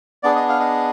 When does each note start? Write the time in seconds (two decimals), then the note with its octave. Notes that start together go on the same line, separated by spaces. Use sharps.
0.23 B3 D4 G#4 D5
0.36 D#5
0.49 F5
0.60 D#5